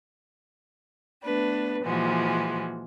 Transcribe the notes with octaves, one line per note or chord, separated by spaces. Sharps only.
A3 B3 D4 B4
A#2 E3 F3 G#3 F#4